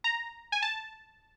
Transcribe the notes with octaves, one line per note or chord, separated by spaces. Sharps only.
A#5
G#5
A5